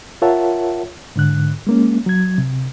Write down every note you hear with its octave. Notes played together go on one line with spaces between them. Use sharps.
F4 A#4 C#5 E5 F#5 A5
G#2 D3 F#6
G#3 A#3 C#4
F#3 G#6
C3